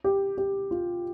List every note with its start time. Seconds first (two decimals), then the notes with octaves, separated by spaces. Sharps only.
0.04 G4
0.38 G4
0.71 F4